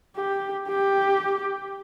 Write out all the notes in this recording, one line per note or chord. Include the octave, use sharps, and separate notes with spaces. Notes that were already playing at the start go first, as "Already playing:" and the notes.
G4
G4